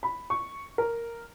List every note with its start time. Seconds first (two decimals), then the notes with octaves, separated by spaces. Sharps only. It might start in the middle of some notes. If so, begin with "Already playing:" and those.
0.03 B5
0.30 C#6
0.78 A#4